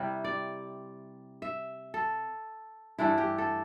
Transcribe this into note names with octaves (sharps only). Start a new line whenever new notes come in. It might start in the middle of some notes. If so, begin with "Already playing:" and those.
Already playing: C3 G3 E4
D5
E5
A4
G2 E3 A3 D4 E4
G4
A4